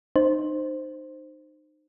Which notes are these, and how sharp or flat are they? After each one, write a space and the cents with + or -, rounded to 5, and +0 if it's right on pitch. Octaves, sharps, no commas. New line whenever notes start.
D#4 -30 C5 +0